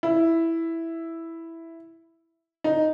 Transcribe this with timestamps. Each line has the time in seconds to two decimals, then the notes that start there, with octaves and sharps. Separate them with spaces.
0.03 E4
2.64 D#4